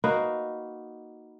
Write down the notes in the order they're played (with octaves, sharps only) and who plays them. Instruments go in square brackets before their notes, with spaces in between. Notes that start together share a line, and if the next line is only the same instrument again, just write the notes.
[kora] A#3 D#4 F#4 B4